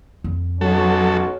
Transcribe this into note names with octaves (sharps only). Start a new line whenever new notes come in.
F2
B1 F#3 C#4 F#4 A4